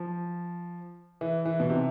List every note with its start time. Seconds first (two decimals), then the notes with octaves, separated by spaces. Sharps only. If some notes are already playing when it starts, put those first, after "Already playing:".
Already playing: F3
1.21 E3
1.45 E3
1.60 B2
1.70 C3